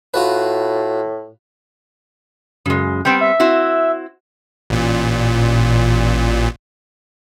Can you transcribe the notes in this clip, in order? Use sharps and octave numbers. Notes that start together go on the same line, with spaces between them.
A2 F4 F#4 B4
F#2 C#3 G#3
G3 B3 C4 G5
E5
C4 E4 F#4
A1 A#2